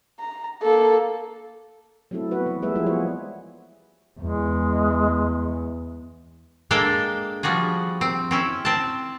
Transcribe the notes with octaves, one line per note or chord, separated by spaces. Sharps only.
A#5
A#3 A4
F#3 A3 C4 E4 A4
B3 F#4 B4
E3
G3 A3 A#3 G#4 B4 E5
F3 G3 G#3 E4 F4 G#4
B3 G#4 C#5
E2 G#3
G#3 A#3 D4 A4 F5 G5
F3 G3 F#4 G#4
C4
C4 C#4 E4
C4 A5